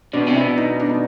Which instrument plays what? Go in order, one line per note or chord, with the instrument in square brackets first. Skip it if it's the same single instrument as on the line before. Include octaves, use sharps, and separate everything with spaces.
[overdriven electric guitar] B2 [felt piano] D4
[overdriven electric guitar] C3
[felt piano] E4
[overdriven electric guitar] B2
[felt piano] D#4
D4
D#4